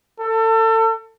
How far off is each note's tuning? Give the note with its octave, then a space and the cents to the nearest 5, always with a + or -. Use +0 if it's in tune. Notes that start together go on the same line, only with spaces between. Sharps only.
A4 +30